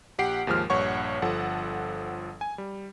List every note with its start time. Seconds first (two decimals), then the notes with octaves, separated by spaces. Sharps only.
0.18 A#1 G4 F#5 C7 D7
0.47 D#2 G#2 F3 G#3 F6
0.70 A#1 G2 C#5 F#5 C#6
1.22 G1 F3 A4 F#5
2.41 G#5
2.58 G3